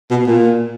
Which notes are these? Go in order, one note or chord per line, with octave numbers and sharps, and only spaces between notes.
B2
A#2